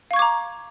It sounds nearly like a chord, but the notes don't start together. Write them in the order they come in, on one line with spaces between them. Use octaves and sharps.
F5 C#6 G#6 D6 A#5